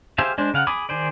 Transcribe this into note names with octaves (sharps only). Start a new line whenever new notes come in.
G4 G#4 C5 E5 F5
G#3 D4 C5
C#3 F5 F#5
G#4 B5 D6 D#6
D#3 G#4 C5 D5